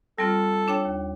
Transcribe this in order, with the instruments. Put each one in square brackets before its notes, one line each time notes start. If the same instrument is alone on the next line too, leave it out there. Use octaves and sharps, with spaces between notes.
[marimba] G3 C4 F4 [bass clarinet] A4
[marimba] D4 C#5 G5
D#2